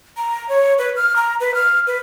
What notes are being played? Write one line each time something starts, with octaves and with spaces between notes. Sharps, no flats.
A#5
C#5
B4
F6
A#5
B4
F6
B4